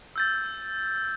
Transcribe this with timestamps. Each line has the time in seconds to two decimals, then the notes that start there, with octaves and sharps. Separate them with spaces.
0.16 E6 G6 A6